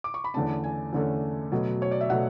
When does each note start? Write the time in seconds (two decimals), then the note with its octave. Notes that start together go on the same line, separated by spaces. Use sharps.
0.04 D6
0.14 C#6
0.24 B5
0.34 E2 D3 A3 C#4 A5
0.64 G#5
0.93 E2 D3 A3 C#4
1.52 B2 F#3 A3
1.82 C#5
1.91 D5
2.01 E5
2.10 B2 F#3 A3 F#5